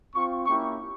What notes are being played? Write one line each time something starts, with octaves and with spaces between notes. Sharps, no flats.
C4 F4 C#6
A#3 C#4 E4 G4 C#6